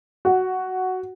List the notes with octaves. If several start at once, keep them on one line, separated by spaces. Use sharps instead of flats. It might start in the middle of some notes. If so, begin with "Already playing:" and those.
F#4